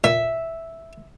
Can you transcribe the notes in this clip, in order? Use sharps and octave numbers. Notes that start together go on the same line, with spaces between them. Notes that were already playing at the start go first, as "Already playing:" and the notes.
A#2 E5